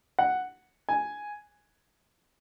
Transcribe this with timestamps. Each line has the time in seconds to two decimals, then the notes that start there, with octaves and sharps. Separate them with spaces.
0.19 F#5
0.89 G#5